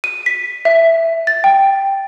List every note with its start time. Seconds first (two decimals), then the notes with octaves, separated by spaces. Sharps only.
0.04 D#7
0.26 B6
0.65 E5
1.27 A6
1.44 G5